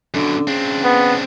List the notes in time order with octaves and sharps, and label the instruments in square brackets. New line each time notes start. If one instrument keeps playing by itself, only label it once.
[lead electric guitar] F#2 B2 [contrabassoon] D3
[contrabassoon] C#3 [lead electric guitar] C4 D4
[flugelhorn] B3